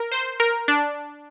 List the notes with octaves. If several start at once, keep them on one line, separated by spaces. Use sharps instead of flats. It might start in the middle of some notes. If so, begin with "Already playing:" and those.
Already playing: A#4
C5
A#4
D4